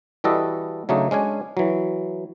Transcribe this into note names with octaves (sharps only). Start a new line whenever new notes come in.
E3 G3 F#4 A4 D#5
C#3 F#3 A3 D4 D#4
G#3 C#4 D4 G#5
E3 F#3